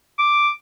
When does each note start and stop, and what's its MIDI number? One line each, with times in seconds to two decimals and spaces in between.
0.19 0.49 86